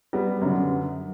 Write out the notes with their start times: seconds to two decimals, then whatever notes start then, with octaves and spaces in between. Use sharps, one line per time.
0.13 G3 B3
0.42 F#2 D3